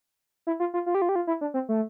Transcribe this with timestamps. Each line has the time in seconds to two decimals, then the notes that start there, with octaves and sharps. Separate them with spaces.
0.47 E4
0.60 F4
0.74 F4
0.86 F4
0.95 G4
1.02 F4
1.09 G4
1.16 F4
1.27 E4
1.41 D4
1.54 C4
1.69 A3